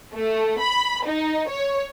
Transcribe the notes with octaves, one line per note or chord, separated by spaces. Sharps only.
A3
B5
D#4
C#5